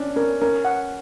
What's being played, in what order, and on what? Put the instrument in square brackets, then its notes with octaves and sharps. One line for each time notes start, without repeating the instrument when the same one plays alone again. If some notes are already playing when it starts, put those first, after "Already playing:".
Already playing: [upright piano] C#4 D4
[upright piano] C#4 [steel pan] A#4
[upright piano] C#4 [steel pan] A#4
[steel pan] F#5